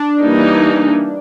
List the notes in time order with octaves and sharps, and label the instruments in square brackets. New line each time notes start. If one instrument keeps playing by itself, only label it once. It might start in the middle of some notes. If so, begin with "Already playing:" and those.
Already playing: [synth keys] D4
[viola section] E3 G3 A#3 D#4